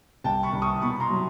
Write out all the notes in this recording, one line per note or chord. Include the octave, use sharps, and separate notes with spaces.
C2 G5 A5
B5 C#6
C2
C#6 D#6
B2 B5 C#6
A#5 C6
F#3